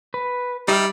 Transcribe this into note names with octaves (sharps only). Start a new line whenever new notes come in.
B4
G3 D#4 E5 F6